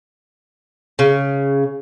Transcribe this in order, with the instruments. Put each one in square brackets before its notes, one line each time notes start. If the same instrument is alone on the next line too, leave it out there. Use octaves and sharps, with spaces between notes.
[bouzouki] C#3